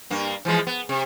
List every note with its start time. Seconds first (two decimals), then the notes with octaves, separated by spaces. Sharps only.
0.11 G2 A#3
0.45 E3 F3 G#3
0.67 B3
0.89 C3